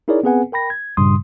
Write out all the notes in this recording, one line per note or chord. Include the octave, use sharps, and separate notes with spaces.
D#4 E4 G#4 A#4 C#5 D5
B3 C4 G#4 B4 F#5 G#5
A#4 G5 B5 A#6
G#6
G2 A#2 C#3 G3 C6 D#6